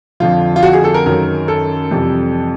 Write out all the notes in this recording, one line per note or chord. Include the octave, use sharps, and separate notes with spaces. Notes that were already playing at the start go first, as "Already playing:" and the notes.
F2 D3 F3 F4
F4
F#4
G#4
A4
A#4
F#2 D#3 F#3 A#4
A4
F2 C3 E3 G3